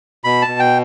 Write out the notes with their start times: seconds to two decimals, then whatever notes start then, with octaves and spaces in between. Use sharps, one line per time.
0.24 B2 B5
0.42 A5
0.48 B2
0.59 G5